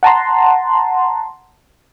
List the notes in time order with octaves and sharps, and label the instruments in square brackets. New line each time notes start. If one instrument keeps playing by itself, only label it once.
[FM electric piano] F#5 A5 A#5 C6